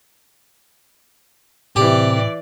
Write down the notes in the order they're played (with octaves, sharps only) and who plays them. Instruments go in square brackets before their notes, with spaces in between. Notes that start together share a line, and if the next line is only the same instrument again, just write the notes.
[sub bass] A2 [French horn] C3 [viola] E3 D5 [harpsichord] G4